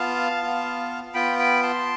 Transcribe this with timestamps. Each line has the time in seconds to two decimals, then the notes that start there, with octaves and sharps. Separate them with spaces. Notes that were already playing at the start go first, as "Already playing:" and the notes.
Already playing: B3 F4 F5 A5
0.42 B3 F4
1.14 B3 F4 G5 B5
1.39 G5 B5
1.63 A5 C6